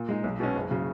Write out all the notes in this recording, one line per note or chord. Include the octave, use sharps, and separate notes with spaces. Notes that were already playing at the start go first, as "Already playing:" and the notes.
Already playing: A#2
G#3 D#4
B1
B2 G#3 C#4
F#1
C#3 F#3